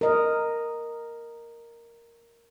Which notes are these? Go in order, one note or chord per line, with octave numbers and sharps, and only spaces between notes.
A#4 D#5